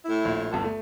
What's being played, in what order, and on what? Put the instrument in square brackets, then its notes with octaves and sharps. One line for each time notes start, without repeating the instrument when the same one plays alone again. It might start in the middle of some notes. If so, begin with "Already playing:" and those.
[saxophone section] A2 E4
[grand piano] A#1
G1 G2 A4
A3